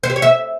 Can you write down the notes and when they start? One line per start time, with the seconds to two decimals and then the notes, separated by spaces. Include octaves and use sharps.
0.03 C5
0.10 G4
0.16 C#5
0.22 E5